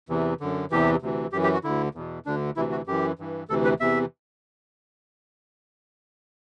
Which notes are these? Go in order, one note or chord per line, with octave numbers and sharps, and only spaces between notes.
E2 C3 E3
F#2 D3
E2 C3 E3 G4
D2 C3 E3
F#2 E3 G4
G4
F#4
D2 D3 E4
E2 B2
D2 D3 D4
D2 C3 E3 E4
F#4
F#2 E3 G4
G2 E3
D2 C3 E3 A4
B4
E2 C3 E3 E5